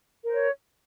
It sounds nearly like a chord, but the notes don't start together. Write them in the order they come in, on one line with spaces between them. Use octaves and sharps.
A#4 C5 C#5